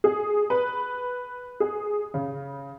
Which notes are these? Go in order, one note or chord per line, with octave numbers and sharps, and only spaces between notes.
G#4
B4
G#4
C#3